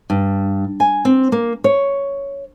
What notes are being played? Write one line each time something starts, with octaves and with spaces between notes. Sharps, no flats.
G2
G#5
C4
A#3
C#5